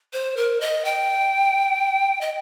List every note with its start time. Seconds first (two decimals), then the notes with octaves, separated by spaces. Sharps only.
0.13 C5
0.37 A#4
0.61 D#5
0.85 G5
2.21 D#5